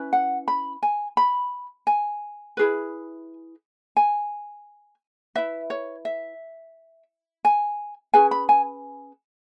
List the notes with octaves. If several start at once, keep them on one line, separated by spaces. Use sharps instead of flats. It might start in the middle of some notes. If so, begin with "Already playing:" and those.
Already playing: C#4 E4 B4
F#5
B5
G#5
B5
G#5
E4 G#4 B4
G#5
E4 B4 E5
C#5
E5
G#5
C#4 G#4 B4 G#5
B5
G#5